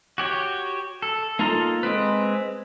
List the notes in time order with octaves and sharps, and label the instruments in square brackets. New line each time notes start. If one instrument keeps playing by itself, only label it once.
[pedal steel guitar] F#4 G4 C#5
A4
A#3 D#4 F4 A4 A#5
G#3 C4 B4